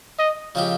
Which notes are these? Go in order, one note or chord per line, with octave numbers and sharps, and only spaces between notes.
D#5
C#3 F3 G#3 C4 G4